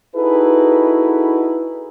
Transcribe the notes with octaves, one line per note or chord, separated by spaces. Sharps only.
D#4 E4 F#4 G#4 A4 B4